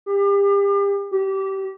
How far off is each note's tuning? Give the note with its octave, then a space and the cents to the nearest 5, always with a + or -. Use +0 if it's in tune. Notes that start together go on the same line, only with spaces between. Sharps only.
G4 +35
G4 -25